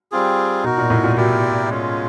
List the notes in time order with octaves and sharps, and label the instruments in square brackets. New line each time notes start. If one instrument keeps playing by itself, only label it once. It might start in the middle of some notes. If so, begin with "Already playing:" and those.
[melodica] G3 C4 F4 G#4
[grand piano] B2 [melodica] D#4 F#4 A#4
[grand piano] A#2
A2
A#2
[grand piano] B2 [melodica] E4 G4 A#4 D5
[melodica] G#3 C#4 F4